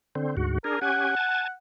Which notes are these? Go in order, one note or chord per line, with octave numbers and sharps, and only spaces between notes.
D3 C4
D2 G#2 F#4
D4 G#4 A#4
C#4 G4 F#5 G#5
G#5 A5